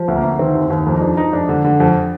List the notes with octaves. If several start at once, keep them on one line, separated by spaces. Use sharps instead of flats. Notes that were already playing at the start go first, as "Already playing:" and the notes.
Already playing: F3
D2
A#3
D2
D#3 C4
D#2
D#2
F2 A#3
D#4
F3 D4
F3 D#4
F2 D4
D3
D3
F2